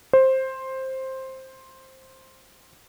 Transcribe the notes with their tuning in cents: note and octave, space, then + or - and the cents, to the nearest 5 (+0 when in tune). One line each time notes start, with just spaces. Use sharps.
C5 +10